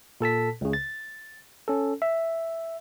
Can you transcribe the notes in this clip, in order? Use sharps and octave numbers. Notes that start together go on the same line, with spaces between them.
A#2 A4 A5 B6
C#2 C#3
A6
C#4 A4
E5